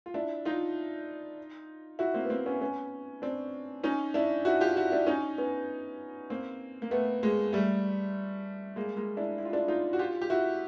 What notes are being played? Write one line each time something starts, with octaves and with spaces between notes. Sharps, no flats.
F4
D4 E4
D#4 F4
E4 F#4
A#3 C4
B3
A#3 C4
B3 C#4
B3 C#4
C4 D4
C#4 D#4
D4 E4
E4 F#4
F4 G4
E4 F#4
D4 E4
C#4 D#4
B3 C#4
A#3 C4
A#3
A3 B3
G#3 A#3
G3 A3
G#3 A#3
G#3 A#3
D4 E4
E4
F4
D4 E4
D#4 F4
F#4
F4 G4
G4
E4 F#4